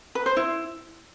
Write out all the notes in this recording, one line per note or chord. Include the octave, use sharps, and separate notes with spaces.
B4
C5
E4